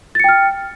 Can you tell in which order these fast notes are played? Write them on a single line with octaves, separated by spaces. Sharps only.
A6 C#7 G5 F6